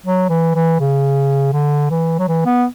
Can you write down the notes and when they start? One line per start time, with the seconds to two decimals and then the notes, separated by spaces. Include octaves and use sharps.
0.06 F#3
0.29 E3
0.55 E3
0.80 C#3
1.53 D3
1.90 E3
2.19 F#3
2.28 E3
2.46 B3